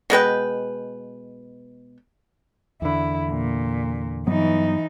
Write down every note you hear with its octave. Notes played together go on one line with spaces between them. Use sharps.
B2 G#3 B4 G5
E2 D3 E4
A#2
G2 E3 F#3 B3 D#4